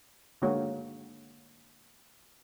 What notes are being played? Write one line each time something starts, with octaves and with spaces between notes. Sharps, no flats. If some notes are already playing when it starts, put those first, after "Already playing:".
D3 G#3 A#3 F#4 C#5